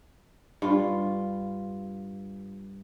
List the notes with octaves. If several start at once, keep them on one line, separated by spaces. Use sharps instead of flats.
G2 F4